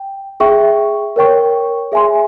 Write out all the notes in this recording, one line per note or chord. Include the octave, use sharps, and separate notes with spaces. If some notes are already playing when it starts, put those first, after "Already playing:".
Already playing: G5
G#4 E5 G5 C#6
A#4 C#5 G5 C#6
G#4 E5 G#5 C6